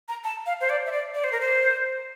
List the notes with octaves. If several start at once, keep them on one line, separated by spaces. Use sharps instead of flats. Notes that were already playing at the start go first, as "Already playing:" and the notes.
A#5
A5
F5
C5
D5
E5
D5
D5
C5
A#4
C5